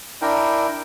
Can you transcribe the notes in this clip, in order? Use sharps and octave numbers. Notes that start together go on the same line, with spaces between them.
D4 E4 A#4 G5